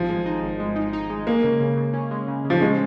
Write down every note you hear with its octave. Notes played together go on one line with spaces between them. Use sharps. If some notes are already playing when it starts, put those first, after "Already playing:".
Already playing: G#1 F3
G#3
D#4
G#1
G#3
D#4
D#4
G#3
G#3 A#3
C#3
C#3
C#3
C#4
G#3
C#3
C#3
F3
G#3 C#4